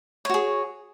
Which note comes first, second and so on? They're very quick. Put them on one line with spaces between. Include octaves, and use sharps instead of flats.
C#5 F#4 G#4